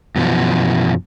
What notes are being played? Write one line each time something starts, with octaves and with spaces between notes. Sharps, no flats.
F#2 B2 E3 F3